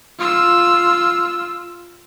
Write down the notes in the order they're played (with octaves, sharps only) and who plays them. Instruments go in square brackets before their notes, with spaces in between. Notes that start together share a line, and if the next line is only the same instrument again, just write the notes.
[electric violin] F4 E6